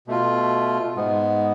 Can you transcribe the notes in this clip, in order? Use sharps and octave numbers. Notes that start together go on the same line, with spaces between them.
B2 A3 F4
G#2 G#3 B3